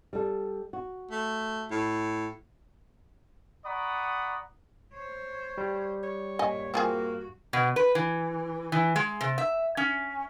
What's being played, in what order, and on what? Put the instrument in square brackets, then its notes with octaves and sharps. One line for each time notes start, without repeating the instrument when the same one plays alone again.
[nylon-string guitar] G3 A4
F#4
[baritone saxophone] A3
A2
[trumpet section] D5 F#5 A#5 B5 C#6 D#6
[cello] C5 C#5
[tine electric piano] G3
[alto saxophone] C#5
[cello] G2 A#2 [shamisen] D#5 G#5
[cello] G2 F#4 [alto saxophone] A#3 [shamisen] C4 F4 G#4
[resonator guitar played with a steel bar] B2
B4
E3
E3
G#3
C3
E5
C#4